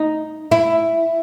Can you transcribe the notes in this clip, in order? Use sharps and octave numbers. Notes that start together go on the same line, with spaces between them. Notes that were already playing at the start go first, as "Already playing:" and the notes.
Already playing: D#4
E4